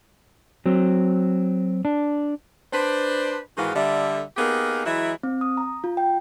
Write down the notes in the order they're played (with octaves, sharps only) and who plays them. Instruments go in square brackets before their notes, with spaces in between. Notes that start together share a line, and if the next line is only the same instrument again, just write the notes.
[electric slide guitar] F#3 C4
D4
[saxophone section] D4 B4 C5
G#2 D#3 E3 F#4 G#4 F5
D3 G3 E5
A#3 B3 D#4 G4 G#4 A#4
E3 F#3 G#3 E4
[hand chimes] C4
D#6
A#5
F4
G5